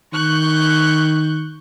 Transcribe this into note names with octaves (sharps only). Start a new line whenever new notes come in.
D#3 C#6 F#6 G6